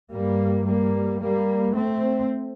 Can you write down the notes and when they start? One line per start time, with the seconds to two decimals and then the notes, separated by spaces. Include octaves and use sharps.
0.12 G2 G3 A#3
0.66 G3 A#3
1.21 G3 A#3
1.75 A3 C4